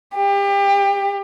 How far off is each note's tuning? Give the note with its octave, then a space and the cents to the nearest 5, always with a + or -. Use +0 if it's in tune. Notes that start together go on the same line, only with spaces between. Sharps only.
G4 +30